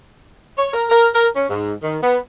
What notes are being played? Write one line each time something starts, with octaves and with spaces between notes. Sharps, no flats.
C#5
A#4
A#4
A#4
C#4
G#2
D#3
B3